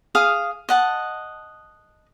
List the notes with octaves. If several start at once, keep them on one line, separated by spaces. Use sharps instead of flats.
G#4 F5 D#6
D#5 F#5 A5